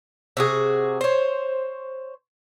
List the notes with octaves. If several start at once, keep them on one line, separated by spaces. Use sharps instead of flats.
C3 F#4 G#4
C5 C#5